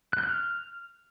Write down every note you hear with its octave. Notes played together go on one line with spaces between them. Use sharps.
F#6
G6
F#6
F6